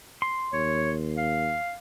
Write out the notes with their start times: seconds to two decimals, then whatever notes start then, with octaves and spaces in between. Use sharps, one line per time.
0.22 C6
0.53 D#2 C#5
1.17 F5